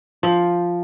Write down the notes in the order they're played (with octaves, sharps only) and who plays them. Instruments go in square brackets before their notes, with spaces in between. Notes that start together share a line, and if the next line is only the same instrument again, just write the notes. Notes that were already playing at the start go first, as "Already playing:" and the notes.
[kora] F3